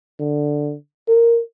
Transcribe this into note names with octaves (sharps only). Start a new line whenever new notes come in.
D3
A#4